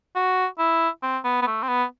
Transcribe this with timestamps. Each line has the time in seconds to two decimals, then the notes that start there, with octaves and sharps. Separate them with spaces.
0.15 F#4
0.58 E4
1.03 C4
1.24 B3
1.42 B3
1.47 A3
1.62 C4
1.68 B3